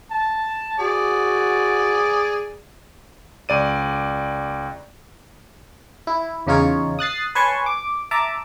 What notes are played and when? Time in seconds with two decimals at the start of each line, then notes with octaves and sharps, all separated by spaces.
0.11 A5
0.80 F#4 G#4 D5
3.49 C#2 D5 D#7
6.07 E4
6.47 E2 C#3 D#4 F4 C#5
6.99 D#6 F#6 A6 C7
7.35 B4 C#5 G#5 A5 C6 C#6
7.66 D6
8.11 E5 A5 A#5 D6